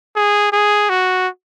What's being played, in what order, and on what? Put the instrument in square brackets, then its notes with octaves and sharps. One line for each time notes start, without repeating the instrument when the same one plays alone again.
[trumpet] G#4
G#4
F#4